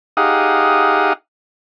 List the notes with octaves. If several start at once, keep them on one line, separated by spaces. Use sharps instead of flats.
D#4 G4 G#4 F5 F#5 D#6